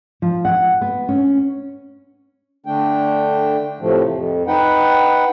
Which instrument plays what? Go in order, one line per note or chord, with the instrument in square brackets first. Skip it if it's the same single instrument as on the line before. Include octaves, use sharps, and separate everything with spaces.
[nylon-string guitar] F3
F#5
B3
C#4
[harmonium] D3 A3 D4 G5
A2 C3 F3 A3
F2
D#4 B4 F#5 G5